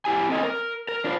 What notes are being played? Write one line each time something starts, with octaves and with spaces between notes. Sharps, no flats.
E4 G4 G#5
C4 A4 D#5 F#5 G#5
A#4
A#4
D4 F4 C5